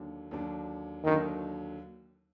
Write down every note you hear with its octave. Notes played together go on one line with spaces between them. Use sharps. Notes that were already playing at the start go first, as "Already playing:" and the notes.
Already playing: D#2 D3 F#3 D4
D#2 D3 F#3 D4
D#2 D3 D#3 F#3 D4